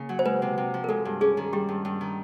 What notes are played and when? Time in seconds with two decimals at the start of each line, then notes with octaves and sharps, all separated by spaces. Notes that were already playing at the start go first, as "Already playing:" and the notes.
Already playing: C#3 A#3
0.09 F#3
0.19 C5
0.25 G#3 B4
0.42 C3
0.58 C3
0.74 F3
0.84 A#4
0.89 G#3 A4
1.05 G2
1.21 C#4 G#4
1.37 D#3
1.53 G3 G4
1.69 G2
1.85 G2
2.01 D#3